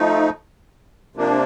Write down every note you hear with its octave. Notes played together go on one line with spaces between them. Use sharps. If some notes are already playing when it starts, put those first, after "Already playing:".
Already playing: F3 A3 D#4
C3 F3 A#3 D4